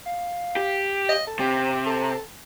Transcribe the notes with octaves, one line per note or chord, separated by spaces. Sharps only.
F5
G4
D#5
A4
C3 G4
A4